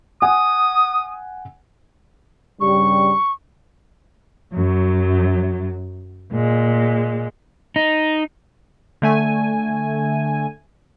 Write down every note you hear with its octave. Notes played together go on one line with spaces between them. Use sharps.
F#5 G#5 D#6
G2 C#3 G3 C#6
F#2 F#3
A#2 G#3
D#4
D3 A3 G#5